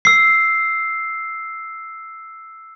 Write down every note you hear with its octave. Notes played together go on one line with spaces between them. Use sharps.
E6 C7